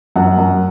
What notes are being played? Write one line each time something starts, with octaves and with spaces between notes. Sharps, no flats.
F#2 F#5
F#2